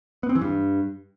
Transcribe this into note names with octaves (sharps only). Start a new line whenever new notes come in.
B3
C4
E3
G2